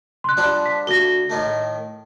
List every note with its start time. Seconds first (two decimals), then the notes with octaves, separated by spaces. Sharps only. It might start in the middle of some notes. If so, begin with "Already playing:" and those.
0.24 C6 F#6
0.37 F3 G3 D4
0.66 B6
0.87 D2 A#6 G7
1.29 A2 D#3 A3